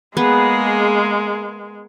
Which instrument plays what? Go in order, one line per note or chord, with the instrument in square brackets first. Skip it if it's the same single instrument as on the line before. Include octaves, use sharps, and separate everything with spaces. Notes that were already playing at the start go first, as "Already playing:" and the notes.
[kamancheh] G#3 [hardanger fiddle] A#3 G#4 [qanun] B3